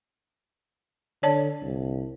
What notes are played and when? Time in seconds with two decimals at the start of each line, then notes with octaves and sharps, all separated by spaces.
1.23 D3 C#5 D5 A5
1.63 C2